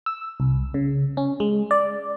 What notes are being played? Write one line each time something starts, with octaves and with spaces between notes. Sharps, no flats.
E6
C2
C#3
C#4
G#3
D5